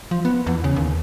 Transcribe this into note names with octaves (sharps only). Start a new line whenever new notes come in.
F3
B3
E2
C#3
D#2